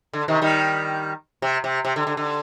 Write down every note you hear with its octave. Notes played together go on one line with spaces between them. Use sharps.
D3
C3 D#3
D#3 G3
C3
C3
C3
D3
D3
D3